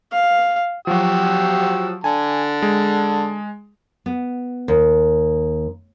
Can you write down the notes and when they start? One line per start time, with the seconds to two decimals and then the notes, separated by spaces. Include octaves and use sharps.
0.12 F5
0.87 F3 F#3 F#4 G4 E6
2.04 D3 G#5 A5
2.62 G#3
4.06 B3
4.68 D#2